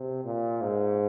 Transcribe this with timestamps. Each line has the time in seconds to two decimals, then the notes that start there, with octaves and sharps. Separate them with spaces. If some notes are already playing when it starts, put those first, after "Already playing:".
Already playing: C3
0.25 A#2
0.61 G#2